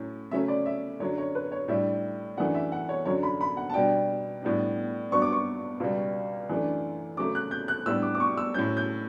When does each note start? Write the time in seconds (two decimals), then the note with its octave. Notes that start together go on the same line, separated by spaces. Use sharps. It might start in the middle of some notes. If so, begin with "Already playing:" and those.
Already playing: A2 F#3 C#4
0.31 C#3 F#3 A3 C#4 E5
0.48 D5
0.66 E5
1.00 F#2 D3 F#3 C#5
1.18 C#5
1.35 B4
1.52 C#5
1.68 A2 G3 D4 E5
2.37 F#2 E3 A3 D4 F#5
2.55 E5
2.72 F#5
2.89 C#5
3.05 F#2 D3 F#3 C#5
3.23 B5
3.41 B5
3.57 F#5
3.70 A5
3.74 B2 G3 D4 G5
4.42 A2 G3 B3 D4
5.11 G2 F#3 B3 D4 C#6
5.22 D6
5.32 C#6
5.80 C#2 B2 G3
6.49 F#2 E3 A3 D4
7.17 C#3 F#3 A3 D6
7.35 F#6
7.51 G6
7.68 F#6
7.86 A2 G3 B3 D4 E6
8.02 D6
8.15 D6
8.20 C#6
8.37 E6
8.54 A2 F#3 C#4 G6
8.77 G6